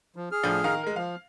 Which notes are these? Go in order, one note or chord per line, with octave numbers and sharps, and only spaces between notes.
F3
G#4 F6
A2 F3 D4
D#3 F5 A#5
G#3 A#4
F3 F5